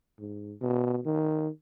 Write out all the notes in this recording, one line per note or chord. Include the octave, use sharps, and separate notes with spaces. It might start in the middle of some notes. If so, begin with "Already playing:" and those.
G#2
B2
D#3